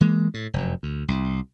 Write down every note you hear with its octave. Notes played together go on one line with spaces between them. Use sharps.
E3 G#3 A#3
A2
F1 F#2
D2
C2